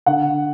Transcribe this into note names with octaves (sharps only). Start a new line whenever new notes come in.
D3 F#5